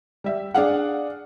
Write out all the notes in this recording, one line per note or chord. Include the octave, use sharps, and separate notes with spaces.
G3 E5
D4 G#4 F5 F#5